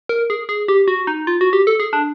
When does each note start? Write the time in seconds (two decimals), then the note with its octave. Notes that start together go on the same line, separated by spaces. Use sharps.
0.09 A#4
0.30 G#4
0.49 G#4
0.68 G4
0.88 F#4
1.07 D#4
1.27 F4
1.41 F#4
1.53 G4
1.67 A4
1.80 G#4
1.93 D4